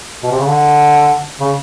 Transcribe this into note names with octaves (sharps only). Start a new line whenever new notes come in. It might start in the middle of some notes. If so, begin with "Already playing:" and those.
B2
C3
C#3
D3
C#3